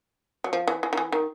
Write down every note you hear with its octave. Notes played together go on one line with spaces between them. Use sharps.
F#3
F3
E3
E3
D#3
E3
D#3